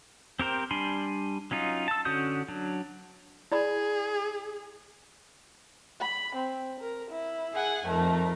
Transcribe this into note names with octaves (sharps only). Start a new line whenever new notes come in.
C4 G4 A#4 C5
G3 D4 G#5 B5 C6
F#3 C#4 D#4 F4
A5 E6
D3 C#4 F#4 D#6 G6
F#3 D4
E4 G#4 D5 B5
B5
C4
A#4
E4
G#4 F#5 G#5
F2 A3 D#4 A#4